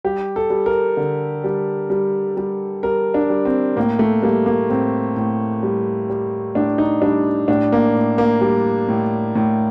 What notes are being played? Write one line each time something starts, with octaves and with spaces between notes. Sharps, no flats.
G3 G4
A4
G3
A#4
D3
G3
G3
G3
G3 A#4
D4
G3
C4
A2 A#3
A3
G3 A#3
A#3
A2 C4
A2
G3
G3
A2 D4
D#4
G3 D4
A2 D4
A#3
A2
A#3
G3
A2
A2